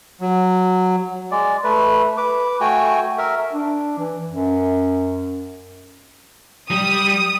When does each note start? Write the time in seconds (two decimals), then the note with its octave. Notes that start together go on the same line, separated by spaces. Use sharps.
0.21 F#3
1.31 G#3 D5
1.64 A3 B4
2.17 B4 D6
2.61 A3 F#4 G5 G#5
3.18 A#4 E5
3.52 D4
3.98 E3
4.28 F#2
6.71 G3 D#6